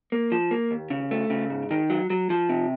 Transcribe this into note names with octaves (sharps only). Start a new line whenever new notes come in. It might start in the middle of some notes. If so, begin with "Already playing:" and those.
A#3
F3
A#3
D#2
C#3
A3
C#3
G#2
D#3
F#3
F#3
F3
C3